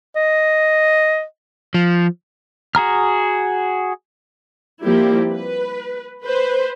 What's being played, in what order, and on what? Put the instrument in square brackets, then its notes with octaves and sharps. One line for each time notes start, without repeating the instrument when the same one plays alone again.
[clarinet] D#5
[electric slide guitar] F3
[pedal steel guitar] F#4 G#4 A#5 F6
[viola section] F3 G3 A#3 C4 E4 G4
B4
B4 C5